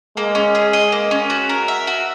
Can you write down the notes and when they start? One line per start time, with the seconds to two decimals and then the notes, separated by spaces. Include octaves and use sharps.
0.17 G#3 A#3
0.35 C#4
0.55 G#4
0.73 D#5
0.92 A#3
1.11 C#4
1.30 F#4
1.49 A#4
1.68 E5
1.87 F#4